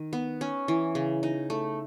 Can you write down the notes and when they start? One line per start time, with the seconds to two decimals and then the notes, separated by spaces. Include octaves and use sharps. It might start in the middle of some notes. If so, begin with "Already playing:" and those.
Already playing: D#3
0.13 B3
0.41 C#4
0.68 E3
0.95 C#3
1.23 D#4
1.50 A3